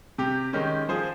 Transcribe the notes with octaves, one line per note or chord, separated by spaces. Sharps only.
C3 G4
D#3 G#3 C#4
F3 G#4 C5